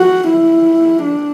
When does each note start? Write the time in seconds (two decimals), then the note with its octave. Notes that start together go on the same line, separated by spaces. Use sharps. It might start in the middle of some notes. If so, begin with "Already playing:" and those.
Already playing: F#4
0.28 E4
1.04 D4